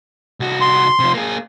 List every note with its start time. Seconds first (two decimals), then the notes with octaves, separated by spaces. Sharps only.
0.40 C2 F#4
0.61 C6
1.00 C3 F3
1.14 A#3 G#4